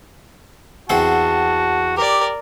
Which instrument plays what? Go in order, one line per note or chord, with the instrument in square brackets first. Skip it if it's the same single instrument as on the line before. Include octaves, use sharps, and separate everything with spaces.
[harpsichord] E2 C4 F#5 [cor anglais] F#4 [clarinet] A5
[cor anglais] G4 [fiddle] A#4 D5